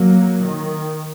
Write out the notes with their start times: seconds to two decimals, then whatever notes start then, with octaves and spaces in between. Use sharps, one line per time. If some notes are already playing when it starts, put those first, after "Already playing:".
Already playing: F#3 A#3
0.42 D#3